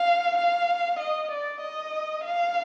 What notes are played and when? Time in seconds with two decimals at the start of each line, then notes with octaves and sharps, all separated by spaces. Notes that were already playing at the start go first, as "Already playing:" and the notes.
Already playing: F5
0.37 F5
0.99 D#5
1.31 D5
1.62 D#5
2.24 F5